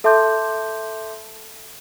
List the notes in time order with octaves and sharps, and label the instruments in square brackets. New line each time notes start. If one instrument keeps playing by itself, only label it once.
[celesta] A4 E5 A5 C6 D6 G6